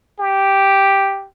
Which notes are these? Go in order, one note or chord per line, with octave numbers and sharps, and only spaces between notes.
G4